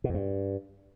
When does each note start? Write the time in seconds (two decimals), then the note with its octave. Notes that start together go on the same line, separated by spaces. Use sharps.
0.04 B2
0.09 F2
0.14 G2